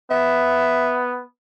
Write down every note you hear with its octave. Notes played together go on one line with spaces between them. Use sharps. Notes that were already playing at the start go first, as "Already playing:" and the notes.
B3 E5